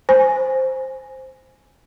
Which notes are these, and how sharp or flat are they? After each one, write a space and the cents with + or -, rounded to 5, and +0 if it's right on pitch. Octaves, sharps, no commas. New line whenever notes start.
C5 +0 G#5 +0